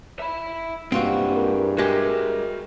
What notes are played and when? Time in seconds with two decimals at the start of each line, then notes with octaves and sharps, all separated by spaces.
0.19 E5 B5
0.92 G2 C3 G#3 A#3 C4 F4 F#4
1.33 E4 G#4 A#4
1.78 G#3 F#4 G4 A#4 E5